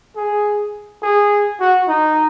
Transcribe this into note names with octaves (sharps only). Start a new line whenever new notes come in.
G#4
G#4
F#4
D#4